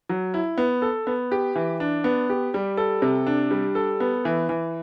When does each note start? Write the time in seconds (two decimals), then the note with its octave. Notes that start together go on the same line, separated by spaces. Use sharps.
0.09 F#3
0.34 E4
0.58 B3
0.82 A4
1.07 B3
1.31 G4
1.56 E3
1.80 D4
2.04 B3
2.29 G4
2.54 G3
2.77 A4
3.02 C3
3.26 D4
3.51 G3
3.75 A4
4.00 B3
4.25 E3
4.49 E3